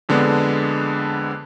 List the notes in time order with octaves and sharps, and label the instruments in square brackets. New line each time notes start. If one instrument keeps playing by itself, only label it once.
[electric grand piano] F2 D3 G#3 B3 D4